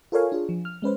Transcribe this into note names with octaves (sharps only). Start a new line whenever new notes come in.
F4 A4 A#4 C#5 F5 G#5
D4 F4 G#4
F3
F6
G#3 C#4 B4 C5